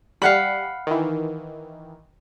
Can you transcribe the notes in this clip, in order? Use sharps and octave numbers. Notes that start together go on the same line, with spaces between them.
G3 F5 F#5 B5
D#3 E3